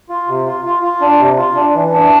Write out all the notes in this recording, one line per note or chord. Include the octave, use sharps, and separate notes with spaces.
F4
C3
F4
F4
F4
D4
C3
F4
D4
E3
D4